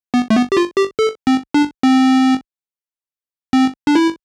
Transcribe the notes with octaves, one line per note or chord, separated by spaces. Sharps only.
B3
A3
B3
G4
F4
G4
A4
C4
D4
C4
C4
D4
E4